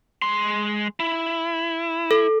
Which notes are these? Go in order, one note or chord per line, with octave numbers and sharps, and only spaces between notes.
G#3 C6
E4
A4